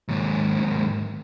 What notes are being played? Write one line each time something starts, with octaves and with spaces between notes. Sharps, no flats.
D#2 G#2